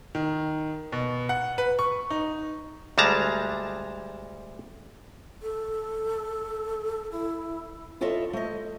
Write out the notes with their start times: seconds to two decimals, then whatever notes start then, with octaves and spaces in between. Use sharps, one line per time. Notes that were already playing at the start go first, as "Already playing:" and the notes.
0.15 D#3
0.92 B2
1.29 F#5
1.58 B4
1.79 C#6
2.11 D#4
2.98 D2 G3 G#3 A5 A#5
5.42 A4
7.12 E4
8.01 E4 F4 A4 C#5 D#5 E5
8.33 A3 D#5